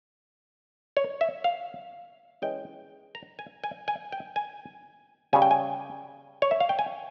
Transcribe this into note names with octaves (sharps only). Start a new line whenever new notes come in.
C#5
E5
F5
E3 G#3 C#4 G5
A#5
G#5
G#5
G#5
G5
G#5
C#3 G3 C#4 G#5
G5
G#5
C#5
E5
F5
G5
G#5